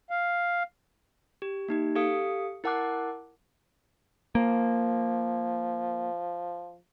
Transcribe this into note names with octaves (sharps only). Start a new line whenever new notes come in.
F5
G4
A#3 D#4 G4
G4 A4 F5 D#6 C#7
E4 A#4 F#5 A5 D6 F#6
F3 A#3